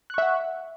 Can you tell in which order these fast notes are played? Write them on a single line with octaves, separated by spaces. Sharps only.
F#6 C#6 E5 F#5